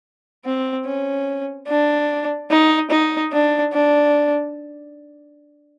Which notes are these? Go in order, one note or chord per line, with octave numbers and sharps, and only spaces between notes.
C4
C#4
D4
D#4
D#4
D4
D4